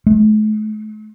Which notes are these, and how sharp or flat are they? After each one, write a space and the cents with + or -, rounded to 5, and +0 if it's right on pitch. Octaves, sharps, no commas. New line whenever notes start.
A3 -45